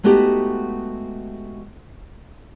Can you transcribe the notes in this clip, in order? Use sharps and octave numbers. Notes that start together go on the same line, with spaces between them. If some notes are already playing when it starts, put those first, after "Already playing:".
G#3 A3 B3 D#4 F#4 G4